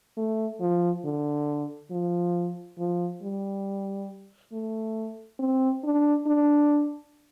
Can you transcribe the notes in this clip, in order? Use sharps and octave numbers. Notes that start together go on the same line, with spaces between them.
A3
F3
D3
F3
F3
G3
A3
C4
D4
D4